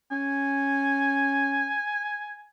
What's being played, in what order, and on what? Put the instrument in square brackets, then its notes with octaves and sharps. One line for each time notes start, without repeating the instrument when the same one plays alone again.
[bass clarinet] C#4 [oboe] G#5